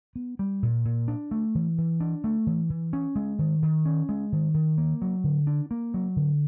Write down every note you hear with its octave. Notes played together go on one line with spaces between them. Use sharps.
B3
G3
A#2
A#2
D4
A3
E3
E3
D4
A3
E3
E3
C#4
G#3
D#3
D#3
C#4
G#3
D#3
D#3
A#3
F#3
D3
D4
A#3
F#3
D3